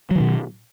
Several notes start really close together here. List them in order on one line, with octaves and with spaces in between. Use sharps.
F#3 D#3 B2